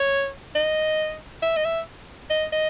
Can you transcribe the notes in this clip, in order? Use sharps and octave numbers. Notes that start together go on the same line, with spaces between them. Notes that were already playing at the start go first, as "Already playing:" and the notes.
Already playing: C#5
D#5
E5
D#5
E5
D#5
D#5